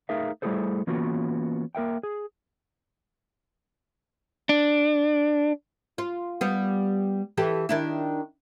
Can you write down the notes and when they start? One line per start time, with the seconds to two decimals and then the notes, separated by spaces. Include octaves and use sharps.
0.09 A3 D#4 G#4 A#4 E5 F5
0.42 G3 A3 E4 G#4 A4 C5
0.87 E3 A#3 B3 C#4 F4 F#4
1.75 A#3 A#4 E5 G5
2.03 G#4
4.49 D4
5.98 F4
6.41 G3 B3
7.37 E3 G4 A4
7.69 D#3 D4 E4